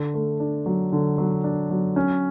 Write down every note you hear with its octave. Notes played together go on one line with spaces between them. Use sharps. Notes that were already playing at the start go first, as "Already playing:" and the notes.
Already playing: D3
A3
D4
F#3
D3
F#3
D4
F#3
C#4